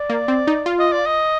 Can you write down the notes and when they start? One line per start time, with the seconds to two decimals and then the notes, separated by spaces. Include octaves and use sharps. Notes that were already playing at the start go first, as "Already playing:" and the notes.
Already playing: D5
0.10 A#3
0.28 C4
0.47 D#4
0.66 F4
0.79 D#5
0.93 D5
1.07 D#5